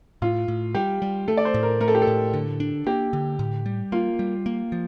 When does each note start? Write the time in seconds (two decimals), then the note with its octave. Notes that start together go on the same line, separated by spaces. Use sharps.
0.22 A2 F4
0.48 A2
0.75 G3 G4
1.02 G3
1.28 A3 A4
1.37 D5
1.45 C5
1.54 A2
1.63 A#4
1.81 A3 A#4
1.88 A4
1.95 G4
2.02 A4
2.07 A2
2.34 D3
2.60 D4
2.86 A#3 G4
3.13 D3
3.39 A2
3.66 G3
3.92 A#3 F4
4.19 G3
4.46 A#3
4.72 F3